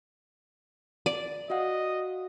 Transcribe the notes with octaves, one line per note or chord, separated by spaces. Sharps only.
D5
F#4 D#5 F5 F#5